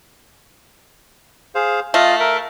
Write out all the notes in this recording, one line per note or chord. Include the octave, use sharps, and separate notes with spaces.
G#4 C5 F5
A3 F4 D#5 F5
A#4 E5